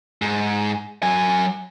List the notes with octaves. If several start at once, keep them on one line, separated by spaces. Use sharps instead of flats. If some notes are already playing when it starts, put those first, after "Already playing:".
G#2
F#3 G#5